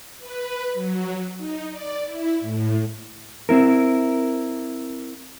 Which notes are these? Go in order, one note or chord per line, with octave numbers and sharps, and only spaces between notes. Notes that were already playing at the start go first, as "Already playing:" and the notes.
B4
F#3
D#4
D5
E4
A2
C4 E4 A#4